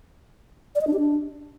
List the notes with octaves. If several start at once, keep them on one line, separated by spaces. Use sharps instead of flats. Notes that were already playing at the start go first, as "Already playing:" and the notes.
D5
D#5
D4
G4
D4